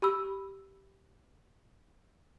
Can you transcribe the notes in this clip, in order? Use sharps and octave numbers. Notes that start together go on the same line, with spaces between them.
G4 B5 E6